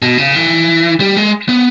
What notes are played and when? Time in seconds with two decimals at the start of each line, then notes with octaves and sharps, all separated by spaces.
0.02 B2
0.18 C#3
0.35 E3
1.00 G3
1.17 G#3
1.49 B3